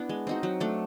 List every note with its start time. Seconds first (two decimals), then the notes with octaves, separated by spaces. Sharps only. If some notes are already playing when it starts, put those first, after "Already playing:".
Already playing: B3 D4 E4
0.09 G#3
0.27 C4 D#4 F#4
0.43 F#3
0.60 A3 D4